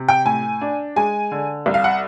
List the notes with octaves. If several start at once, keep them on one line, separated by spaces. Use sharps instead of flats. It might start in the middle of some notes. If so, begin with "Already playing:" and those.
Already playing: C3
G5
A2 G#5
D4
G#3 G#5
D3
C2
F5
F#5